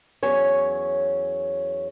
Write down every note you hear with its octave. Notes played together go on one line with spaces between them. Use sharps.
E2 F#3 C#4 C#5